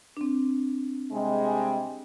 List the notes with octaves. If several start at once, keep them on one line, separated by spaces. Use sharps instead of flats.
C4 D4
C3 G3 G#3